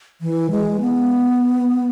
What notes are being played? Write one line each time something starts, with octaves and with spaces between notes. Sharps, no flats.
E3
G#3
B3